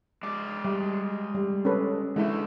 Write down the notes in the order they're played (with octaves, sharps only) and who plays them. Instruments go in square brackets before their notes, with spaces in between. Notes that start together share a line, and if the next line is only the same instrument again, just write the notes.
[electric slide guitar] G#3 D5
[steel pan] G3
G3
C#4 A4 B4
[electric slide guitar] D3 A3 [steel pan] G#3 E4